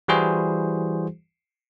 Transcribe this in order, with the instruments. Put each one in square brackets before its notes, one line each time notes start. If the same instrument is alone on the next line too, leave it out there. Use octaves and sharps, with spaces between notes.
[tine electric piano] E3 G3 E4 F#4 G#4 C5